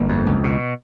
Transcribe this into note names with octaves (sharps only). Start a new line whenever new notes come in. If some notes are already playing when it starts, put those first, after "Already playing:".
Already playing: G1 A#3
F2
C#2
B2